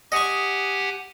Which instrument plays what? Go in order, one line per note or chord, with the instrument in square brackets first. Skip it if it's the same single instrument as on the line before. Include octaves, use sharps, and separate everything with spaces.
[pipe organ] G4 F#5 G#5 [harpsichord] D#5 C#6